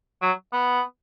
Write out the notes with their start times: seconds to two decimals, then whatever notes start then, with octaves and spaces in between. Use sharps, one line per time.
0.22 F#3
0.53 B3